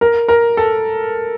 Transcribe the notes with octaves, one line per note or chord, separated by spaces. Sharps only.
A#4
A#4
A4